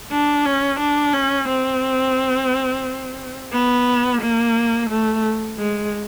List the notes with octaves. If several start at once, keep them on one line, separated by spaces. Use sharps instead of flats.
D4
C#4
D4
C#4
C4
B3
A#3
A3
G#3